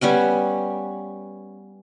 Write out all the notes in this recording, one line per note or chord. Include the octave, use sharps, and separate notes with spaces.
G3 B3 C#4 G#5